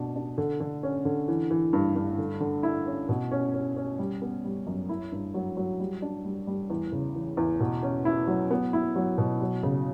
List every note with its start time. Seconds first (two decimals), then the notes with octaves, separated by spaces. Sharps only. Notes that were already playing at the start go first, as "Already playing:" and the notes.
Already playing: B2 D4
0.16 D4
0.38 D3
0.60 D3
0.83 C#4
1.05 D3
1.28 E3
1.51 E3
1.73 G2
1.96 G2
2.18 D3
2.40 D3
2.63 E4
2.86 C#4
3.09 B2
3.31 C#4
3.54 C#4
3.76 C#4
3.99 G3
4.22 B3
4.44 G3
4.67 F#2
4.89 E4
5.12 G2
5.34 F#3
5.57 F#3
5.80 G3
6.02 D4
6.25 G3
6.47 G3
6.70 E2
6.92 C#3
7.15 E3
7.37 E2
7.60 B2
7.83 C#4
8.05 E4
8.27 F#3
8.51 B3
8.73 E4
8.96 F#3
9.18 B2
9.41 F#3
9.63 C#3